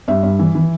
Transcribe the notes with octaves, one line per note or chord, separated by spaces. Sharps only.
G2 E5
G2
E3
E3